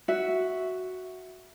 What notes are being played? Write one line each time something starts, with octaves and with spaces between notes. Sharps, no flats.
F#4 E5